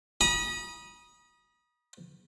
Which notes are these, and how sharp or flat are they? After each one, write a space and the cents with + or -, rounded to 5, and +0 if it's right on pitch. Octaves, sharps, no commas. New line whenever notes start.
B5 -45 D#6 +0